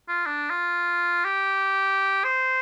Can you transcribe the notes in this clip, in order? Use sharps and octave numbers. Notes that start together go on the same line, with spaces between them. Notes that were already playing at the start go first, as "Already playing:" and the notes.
F4
D4
F4
G4
C5